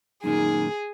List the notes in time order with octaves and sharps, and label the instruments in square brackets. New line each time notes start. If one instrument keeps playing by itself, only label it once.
[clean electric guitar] F#2 A#2 D#3 [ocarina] D#4 [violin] G#4